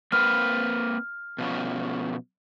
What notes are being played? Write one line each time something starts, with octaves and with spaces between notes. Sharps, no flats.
A#3 C4 B4 F6
B2 F3 C#4